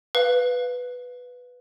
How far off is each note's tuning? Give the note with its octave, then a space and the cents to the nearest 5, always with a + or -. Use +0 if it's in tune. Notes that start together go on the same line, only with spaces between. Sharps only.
B4 +0 F5 +10